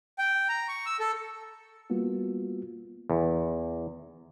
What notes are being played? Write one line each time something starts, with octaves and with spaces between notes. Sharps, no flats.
G5
A#5
C#6
E6
A4
G3 A#3 B3 F4 F#4
E2